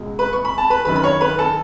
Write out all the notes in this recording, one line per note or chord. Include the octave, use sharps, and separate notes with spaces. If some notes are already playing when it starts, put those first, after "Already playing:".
Already playing: C#2 B2 G#3
B4 B5
C#6
B5
A5
B4 B5
F#2 D#3 F#3 B4 B5
B5
C#5 C#6
B4 B5
A4 A5